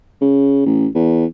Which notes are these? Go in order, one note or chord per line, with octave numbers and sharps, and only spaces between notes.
C#3
A1
E2